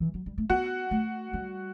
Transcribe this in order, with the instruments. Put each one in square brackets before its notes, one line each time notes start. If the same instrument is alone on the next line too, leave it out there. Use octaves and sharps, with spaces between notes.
[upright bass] E3
F#3
G3
A3
[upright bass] B3 [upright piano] F#4 F#5
[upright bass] A3
G3